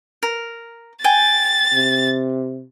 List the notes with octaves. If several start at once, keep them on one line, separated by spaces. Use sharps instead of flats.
A#4
G5 G#5 A6
C3